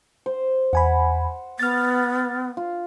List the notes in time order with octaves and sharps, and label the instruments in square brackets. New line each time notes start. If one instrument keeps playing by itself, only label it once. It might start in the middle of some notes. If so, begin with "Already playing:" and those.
[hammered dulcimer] C5
[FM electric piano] E2 G#5 B5 [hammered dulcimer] F#5
[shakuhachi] B3 [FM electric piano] F6 A6
[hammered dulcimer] F4